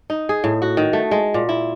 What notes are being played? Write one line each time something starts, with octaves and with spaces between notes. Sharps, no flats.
D#4
G#4
A2
F#4
D#3
A3
G#3
A#2
E4